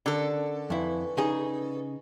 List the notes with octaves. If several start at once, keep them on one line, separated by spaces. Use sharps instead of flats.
D3 C#4 A4 A#4
F2 E4 B4 G#5 C#6
C#3 D#4 G#4